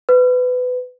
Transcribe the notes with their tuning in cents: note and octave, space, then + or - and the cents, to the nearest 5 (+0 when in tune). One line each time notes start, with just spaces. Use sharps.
B4 +20